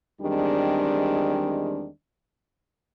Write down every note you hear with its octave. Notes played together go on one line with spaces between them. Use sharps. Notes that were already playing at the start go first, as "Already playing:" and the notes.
E2 D#3 G3 G#3 C4 D4